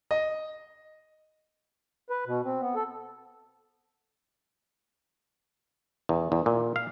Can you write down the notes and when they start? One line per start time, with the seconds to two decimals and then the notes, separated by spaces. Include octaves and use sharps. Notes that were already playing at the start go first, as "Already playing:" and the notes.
0.11 D#5
2.10 B4
2.27 B2
2.45 C4
2.61 B3
2.75 A4
6.09 E2
6.32 E2
6.46 A#2
6.76 F5